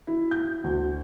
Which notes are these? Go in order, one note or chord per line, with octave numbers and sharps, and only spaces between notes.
E4
G6
D2